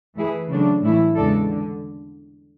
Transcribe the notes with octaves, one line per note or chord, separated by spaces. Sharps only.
E3 A3 E4 G#4 B4
C#3 F#3 A3 D4
A2 E3 A3 E4
E2 C#3 G#3 D4 A4
D3